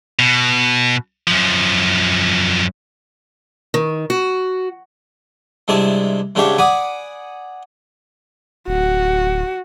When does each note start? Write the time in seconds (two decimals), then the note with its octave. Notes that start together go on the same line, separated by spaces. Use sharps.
0.19 B2
1.27 F#2 F3
3.74 D#3
4.10 F#4
5.68 G2 C3 G#3 E4 D5 A5
6.35 G#2 C#3 D4 G4 C#5 E5
6.58 D5 F#5 G#5 B5 D6 D#6
8.68 D1 F#4